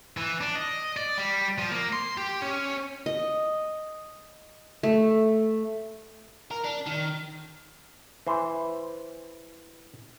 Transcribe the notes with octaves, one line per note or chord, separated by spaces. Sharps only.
E3
D4
D#5
D5
G3
F3
A#3
C6
G4
C#4
D#5
A3
A#4
D4
D#3
E3 C5